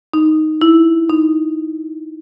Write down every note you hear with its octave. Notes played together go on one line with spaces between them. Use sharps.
D#4
E4
D#4